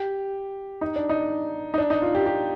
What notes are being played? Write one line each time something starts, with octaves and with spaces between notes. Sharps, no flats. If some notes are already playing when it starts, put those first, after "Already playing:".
Already playing: G4
D#4
D4
D#4
D#4
D4
D#4
F4
G4
G4